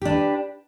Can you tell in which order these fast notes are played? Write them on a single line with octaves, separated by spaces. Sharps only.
G4 D4 B4